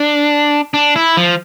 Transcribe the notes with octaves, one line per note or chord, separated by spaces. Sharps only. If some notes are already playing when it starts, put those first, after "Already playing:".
Already playing: D4
D4
E4
F3